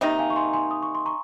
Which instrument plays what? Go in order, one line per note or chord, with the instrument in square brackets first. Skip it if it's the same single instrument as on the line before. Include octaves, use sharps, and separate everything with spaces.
[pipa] C3 D#3 A#3 D#4
[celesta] F5 G#5
C#6
G#5 C6
G#5 C6
D#6
C#6
C6
A#5 C#6